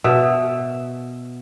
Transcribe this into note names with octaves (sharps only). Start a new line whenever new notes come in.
B2 E5